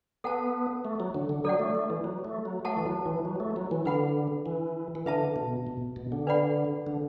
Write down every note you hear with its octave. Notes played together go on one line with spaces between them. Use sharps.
B3 A4 F#5 A5
A3
F#3
D3
D3
F#3 A4 D5 F#5
A3
A3
E3
F#3
A3
F#3
A3 A4 F#5 A5
E3
F#3
E3
F#3
A3
F#3
E3
D3 B4 F#5 B5
E3
E3
D3 B4 E5 A5
B2
B2
B2
D3
D4 B4 D5 F#5 B5
D3